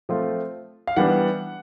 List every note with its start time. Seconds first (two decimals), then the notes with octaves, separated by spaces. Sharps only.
0.09 F3 A3 C4 F4
0.87 F5
0.96 E3 G3 B3 D4 F#5